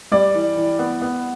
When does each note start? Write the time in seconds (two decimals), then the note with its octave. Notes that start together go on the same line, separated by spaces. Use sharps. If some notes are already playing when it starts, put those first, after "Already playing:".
0.12 G3 D5
0.34 E3
0.57 E3
0.79 B3
1.02 B3